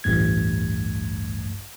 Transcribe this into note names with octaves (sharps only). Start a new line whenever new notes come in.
A1 D2 G2 A3 G#6